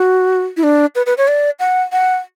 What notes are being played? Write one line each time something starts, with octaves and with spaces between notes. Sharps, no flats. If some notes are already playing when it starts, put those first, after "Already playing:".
Already playing: F#4
E4
D4
B4
B4
C#5
D5
F#5
F#5